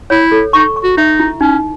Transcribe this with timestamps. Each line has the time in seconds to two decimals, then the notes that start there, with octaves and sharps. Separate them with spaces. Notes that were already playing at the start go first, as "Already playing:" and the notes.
0.10 E4 C#5
0.32 A4
0.53 D#4 C#6
0.76 C#6
0.84 F#4
0.97 D#4 E5
1.20 E4
1.41 C#4 D#4